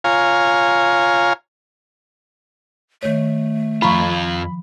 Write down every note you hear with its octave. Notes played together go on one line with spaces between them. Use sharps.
F4 C#5 F5 G#5 A#5
D#3 A3 C#5
F2 G#2 F3 F4 A#5 B5 C#6